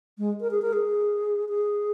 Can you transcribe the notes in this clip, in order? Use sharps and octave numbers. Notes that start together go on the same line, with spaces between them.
G#3
A#4
G#4
A#4
G#4
G#4